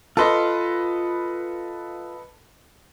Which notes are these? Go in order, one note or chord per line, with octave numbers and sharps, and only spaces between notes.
F4 A4 B4 D#5 C6